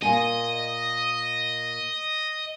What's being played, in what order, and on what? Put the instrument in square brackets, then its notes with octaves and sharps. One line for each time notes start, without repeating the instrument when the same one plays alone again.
[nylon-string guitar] A#2 G#5 [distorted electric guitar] D#5